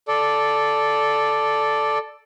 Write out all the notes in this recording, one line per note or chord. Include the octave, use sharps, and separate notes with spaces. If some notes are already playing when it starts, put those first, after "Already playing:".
A4 D5